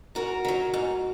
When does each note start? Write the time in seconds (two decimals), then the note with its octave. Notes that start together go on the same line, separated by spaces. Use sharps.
0.15 G#2 F#4 A#4
0.45 D#3 F#3
0.74 G#2